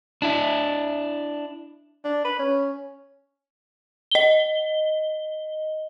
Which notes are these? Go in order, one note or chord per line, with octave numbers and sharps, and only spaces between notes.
D4 E4 E5
D4
B4
C#4
D#5 G7